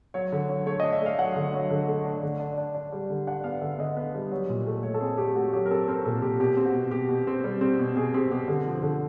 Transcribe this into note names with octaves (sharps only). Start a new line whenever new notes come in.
F#3 C#5
D3
F#3
A3 C#5
D4 D#5
E5
A3 F5
F#3 F#5
D3
F#3
D3
A3
D4
D3
D4
D4
D4
G3
D3
D4 F#5
B3 F5
D3 E5
D3 D#5
B3
G3
F#3
A#2
A3
A3 C#5
A4
C4 G#4
A3 G4
A3 F#4
F#3 G4
A#4
C4 A4
C4 A#4
A#2 A4
A#2 G4
B2 G4
C4
F#4
B2
B2 G4
B2
C4
G3
C4
B2
B2 G#4
C4 G4
B2 G4
D3
F3
D3